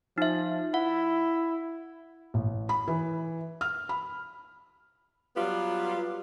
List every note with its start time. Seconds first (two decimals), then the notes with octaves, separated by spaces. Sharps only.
0.18 F3 D#4 E5
0.74 E4 F#5
2.34 A1
2.69 B5
2.88 E3
3.61 F6
3.89 B5
5.37 F#3 G3 B3 F4